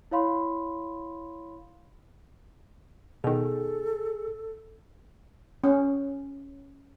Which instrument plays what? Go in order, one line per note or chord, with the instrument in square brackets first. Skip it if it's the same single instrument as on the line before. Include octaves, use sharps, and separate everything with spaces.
[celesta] E4 C#5 F5 B5 C6
[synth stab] B2 D#3 [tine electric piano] G#4 [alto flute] A4
[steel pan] C#4